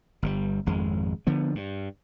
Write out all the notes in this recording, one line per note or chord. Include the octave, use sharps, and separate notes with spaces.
G1 C#3 G3
G#1 F2 G#3
D3 F3 B3
G2